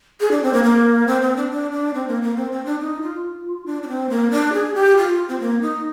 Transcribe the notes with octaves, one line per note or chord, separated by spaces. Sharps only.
G#4
D4
C4
A#3
A#3
C4
C4
D4
D4
D4
C4
A#3
A#3
C4
C4
D4
D#4
F4
D4
D4
C4
A#3
D4
G#4
G4
F4
C4
A#3
D#4